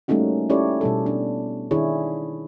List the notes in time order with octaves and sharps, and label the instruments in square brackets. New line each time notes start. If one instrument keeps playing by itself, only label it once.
[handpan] G3 A3 A#3 C#4 D#4 F#4
C#4 E4 G4 A4 C#5 D5
B2 G3 A4
D4
D#3 D4 E4 G#4 C#5